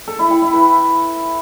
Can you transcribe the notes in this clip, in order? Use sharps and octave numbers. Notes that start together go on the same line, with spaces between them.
A4
E4
G5
E4
B4